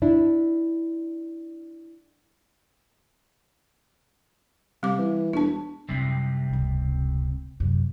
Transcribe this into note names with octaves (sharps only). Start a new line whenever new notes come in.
D4 E4
C3 G3 D6
E3
E1 D4 A5
F#2 C3 D#3 G3 C4
D#1 C#2
F#2 C3